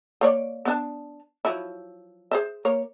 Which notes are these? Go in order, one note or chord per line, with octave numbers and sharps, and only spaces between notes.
A#3 C#5 D5
B3 D4 A5
F3 F#3 E4
G#4 C5 E5
A#3 A#4 C#5